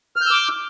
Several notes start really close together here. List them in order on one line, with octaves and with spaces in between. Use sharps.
F6 G6 E6 D6